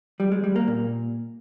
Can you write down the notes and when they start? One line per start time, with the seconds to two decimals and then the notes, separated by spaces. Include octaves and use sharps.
0.20 G3
0.32 G#3
0.44 G3
0.56 A#3
0.68 A#2